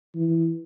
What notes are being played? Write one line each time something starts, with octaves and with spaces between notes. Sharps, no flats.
E3